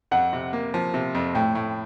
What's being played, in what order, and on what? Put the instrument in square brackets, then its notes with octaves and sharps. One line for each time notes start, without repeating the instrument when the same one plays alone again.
[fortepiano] F2 [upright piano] F#5
[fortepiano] C3
A#3
F3
C3
F2
[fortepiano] A2 [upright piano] G5
[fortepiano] A2